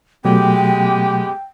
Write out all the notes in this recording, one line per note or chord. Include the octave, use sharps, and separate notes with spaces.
B2 F#3 G#3 A3 B3 G4 G5